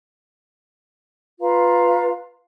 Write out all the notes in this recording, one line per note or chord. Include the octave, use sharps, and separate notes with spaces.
F4 B4 F5 A#5